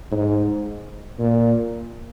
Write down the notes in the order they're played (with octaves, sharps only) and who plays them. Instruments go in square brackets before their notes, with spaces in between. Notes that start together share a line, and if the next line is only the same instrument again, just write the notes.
[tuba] G#2
A#2